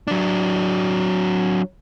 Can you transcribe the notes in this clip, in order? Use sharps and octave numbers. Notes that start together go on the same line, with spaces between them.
F#3 D4